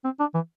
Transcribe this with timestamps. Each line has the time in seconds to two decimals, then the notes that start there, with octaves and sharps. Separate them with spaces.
0.04 C4
0.19 D4
0.34 E3